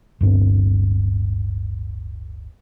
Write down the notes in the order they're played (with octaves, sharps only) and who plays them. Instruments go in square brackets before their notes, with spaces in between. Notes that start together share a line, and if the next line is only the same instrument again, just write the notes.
[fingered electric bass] D1 G1 G2 C4